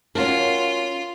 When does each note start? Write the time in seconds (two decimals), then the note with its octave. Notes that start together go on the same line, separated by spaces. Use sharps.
0.15 C#4 F4 F#4 A#4